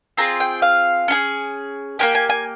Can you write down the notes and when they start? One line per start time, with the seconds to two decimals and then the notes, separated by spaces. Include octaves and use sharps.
0.17 C4 F4 G#4 A#5
0.40 G5
0.62 F5
1.08 C#4 F4 G#4
1.99 A#3 C#4 G4 G#5
2.15 G#5
2.30 G#5